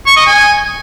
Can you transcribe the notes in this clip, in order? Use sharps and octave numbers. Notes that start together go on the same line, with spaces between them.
C#6
D#5
G#5